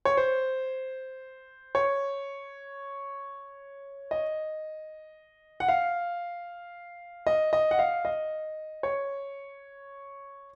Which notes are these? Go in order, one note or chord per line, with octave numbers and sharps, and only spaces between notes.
C#5
C5
C#5
D#5
F#5
F5
D#5
D#5
F#5
F5
D#5
C#5